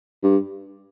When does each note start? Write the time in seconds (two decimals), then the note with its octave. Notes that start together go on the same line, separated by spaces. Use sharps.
0.23 G2